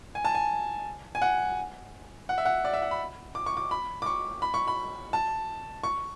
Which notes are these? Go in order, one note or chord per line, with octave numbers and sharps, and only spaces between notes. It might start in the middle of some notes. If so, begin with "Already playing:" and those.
G#5
A5
G#5
G#5
F#5
F#5
E5
F#5
D5
E5
F#5
B5
D6
C#6
D6
B5
D6
C#6
B5
C#6
B5
A5
C#6